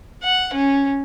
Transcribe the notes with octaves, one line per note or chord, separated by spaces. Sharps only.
F#5
C#4